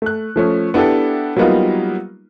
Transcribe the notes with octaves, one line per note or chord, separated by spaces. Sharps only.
A3 F#6
F3 A3 C#4
B3 D4 E4 G4 A4
F#3 G3 A#3 B3 D#4 F4